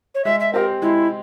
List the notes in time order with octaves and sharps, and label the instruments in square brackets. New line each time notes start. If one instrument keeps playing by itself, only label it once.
[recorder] C#5
[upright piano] G#3 [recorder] E5
[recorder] E5
[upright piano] C4 G4 [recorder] A#4
[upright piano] G#3 [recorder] E4